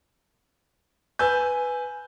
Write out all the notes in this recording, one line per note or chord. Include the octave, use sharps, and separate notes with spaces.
B4 G#5 E6 G6